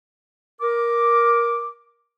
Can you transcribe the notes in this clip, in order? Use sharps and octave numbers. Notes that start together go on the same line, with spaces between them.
A#4 D6